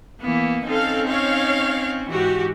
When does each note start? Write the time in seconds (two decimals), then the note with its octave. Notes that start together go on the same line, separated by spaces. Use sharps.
0.21 E3 A#3 B3
0.67 C4 C#4 D#4 A4 F5
1.08 C#5 F5
2.10 G#2 E3 F#4 G4